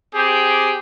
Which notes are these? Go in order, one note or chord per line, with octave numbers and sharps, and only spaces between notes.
C4 G4 G#4 G5